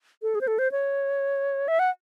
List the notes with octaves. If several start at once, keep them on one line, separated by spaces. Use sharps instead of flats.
A4
G#4
C5
A4
C5
C#5
E5
F#5